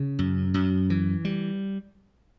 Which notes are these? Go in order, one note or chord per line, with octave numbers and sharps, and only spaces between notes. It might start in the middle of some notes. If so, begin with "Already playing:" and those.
Already playing: C#3
F#2
F#2
E3
G3